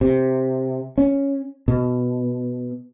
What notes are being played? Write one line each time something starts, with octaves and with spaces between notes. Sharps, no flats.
C3
C#4
B2